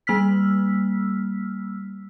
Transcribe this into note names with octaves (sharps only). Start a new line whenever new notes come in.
G3 A#3 E6 F6 B6